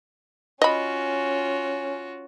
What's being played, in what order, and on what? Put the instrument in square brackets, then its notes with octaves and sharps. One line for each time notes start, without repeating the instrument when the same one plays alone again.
[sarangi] C#4 [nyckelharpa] F4 F#4 [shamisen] D#5 B5